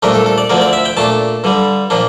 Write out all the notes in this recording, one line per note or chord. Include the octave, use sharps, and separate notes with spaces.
C2 A#2 A3 D4 A#4
A4
A4
D5
D2 D3 F3 C4 A#4
D5
E5
G5
A#2 A3 D4 A5
G2 D3 G3
A#2 F3 A#3 D4